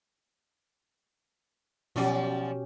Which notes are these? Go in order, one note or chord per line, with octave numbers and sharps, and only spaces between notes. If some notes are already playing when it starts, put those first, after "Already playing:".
B2 F3 F#3 C#4 G4 D5